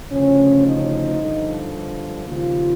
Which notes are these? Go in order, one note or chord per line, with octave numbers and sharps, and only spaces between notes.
D2 C#3 F3 C#4
D#4
G2 D3 F3
D#2 C#3 F3 F4